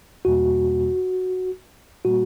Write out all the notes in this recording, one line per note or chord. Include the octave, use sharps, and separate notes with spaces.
E2 B2 G3 A#3 F#4
A#2 G3 A#3 F#4